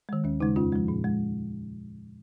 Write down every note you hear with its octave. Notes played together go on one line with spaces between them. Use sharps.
D#3 G#3
D#2 C#4
C#3 G#3 D#4
F2 C#4 F4
F3 G#3
A#2
G#3